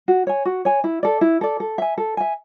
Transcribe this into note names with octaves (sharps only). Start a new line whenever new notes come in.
F#4
C#5 G#5
F#4
C#5 G#5
E4
A4 D5
E4
A4 D5
A4
E5 G#5
A4
E5 G#5